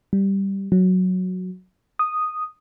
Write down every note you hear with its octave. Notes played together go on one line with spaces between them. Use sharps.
G3
F#3
D#6